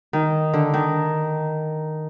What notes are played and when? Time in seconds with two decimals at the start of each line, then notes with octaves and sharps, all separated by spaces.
0.13 D#3
0.53 D3
0.74 D#3